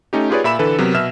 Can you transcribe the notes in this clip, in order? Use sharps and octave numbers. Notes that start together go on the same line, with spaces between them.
A3 C#4 D#4 G4
F4 G4 G#4 B4 C#5 D5
A#2 E5 B5 E6 E7
D3 E3 A4 B4
C3 F#3 B3 A#4
B2 E5 E6 F6 E7